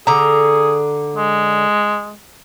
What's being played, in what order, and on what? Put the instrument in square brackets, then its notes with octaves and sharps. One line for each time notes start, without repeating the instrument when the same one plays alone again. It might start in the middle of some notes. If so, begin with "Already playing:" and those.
[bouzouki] D3 A#5 [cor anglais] G#4
[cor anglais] G#3